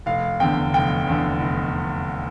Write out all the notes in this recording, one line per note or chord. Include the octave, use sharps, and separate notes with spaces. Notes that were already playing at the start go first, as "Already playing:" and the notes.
F1 F5
E2 D3 G5
F1 G5
E2 D3
F1